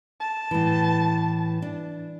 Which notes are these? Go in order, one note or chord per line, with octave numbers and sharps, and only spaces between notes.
A5
A2 E3
D4